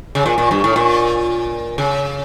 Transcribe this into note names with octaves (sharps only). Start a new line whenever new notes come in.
C#3
A#2
A#2
G2
A2
A#2
C#3